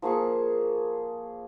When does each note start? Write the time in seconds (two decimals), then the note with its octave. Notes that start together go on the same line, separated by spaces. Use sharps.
0.02 F3 A#3 G#4 C#6